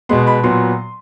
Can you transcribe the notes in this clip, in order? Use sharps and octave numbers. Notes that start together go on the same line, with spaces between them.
B2 G#3 B3 C6
B5
A#2 F#3 B3 C6